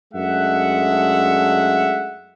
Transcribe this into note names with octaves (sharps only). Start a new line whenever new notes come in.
F#2 G#3 A3 D4 E5 F#5